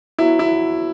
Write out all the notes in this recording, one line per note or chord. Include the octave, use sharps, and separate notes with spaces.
F#3 B3 E4 F#4
E4